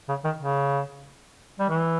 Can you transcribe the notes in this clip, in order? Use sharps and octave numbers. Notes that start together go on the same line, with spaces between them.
C#3
D#3
C#3
G3
E3